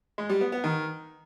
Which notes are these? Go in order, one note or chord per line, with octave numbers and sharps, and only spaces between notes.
G#3
G3
B3
B3
D#3